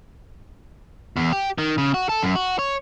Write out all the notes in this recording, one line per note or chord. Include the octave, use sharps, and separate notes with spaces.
E2
G4
D#3
C#3
F#4
A4
F#2
F#4
C#5